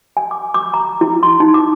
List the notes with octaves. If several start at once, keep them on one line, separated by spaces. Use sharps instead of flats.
G#5
D6
D6
A#5
E4
C6
D#4
D6